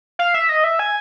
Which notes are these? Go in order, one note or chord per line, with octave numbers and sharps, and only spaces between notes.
F5
E5
D#5
E5
G#5